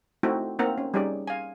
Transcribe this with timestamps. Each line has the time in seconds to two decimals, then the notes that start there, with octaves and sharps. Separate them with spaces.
0.23 A3 C4 D#4 E4 F#4
0.59 A#3 C4 D#4 A#4 F#5 A#5
0.78 C#4
0.94 G3 C#4 D#4 G4 G#4 D5
1.28 F5 G#5